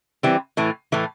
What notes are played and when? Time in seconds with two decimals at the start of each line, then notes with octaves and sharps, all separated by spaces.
0.23 E3 G3 C4
0.57 A2 E3 A3
0.92 A2 E3 A3